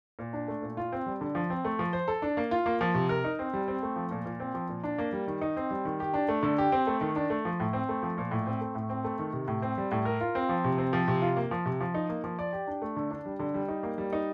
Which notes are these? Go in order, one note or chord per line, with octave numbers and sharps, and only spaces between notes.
A#2
D4
A3
A#2
F4
C4
G3
D3
F3
C4
A3
F3
C5
A4
D4
A#3
F4
A#3
F3
C3
A#4
D#4
C4
G3
C4
A3
F3
A#2
A#2
C4
F3
A#2
D4
A#3
G3
D#3
D#4
C4
G3
D#3
G4
D4
A3
D3
G4
C4
A3
D#3
D4
A3
F3
A2
C4
A3
F3
A#2
A2
C4
A3
A2
C4
A3
D#3
C3
A2
C4
G3
A2
A#4
F4
C4
F3
C3
C4
F3
C3
F4
A#3
F3
C3
F3
D#4
A#3
F3
D5
G4
D4
A3
D3
D4
G3
D3
G3
D#4
A#3
G3
D#4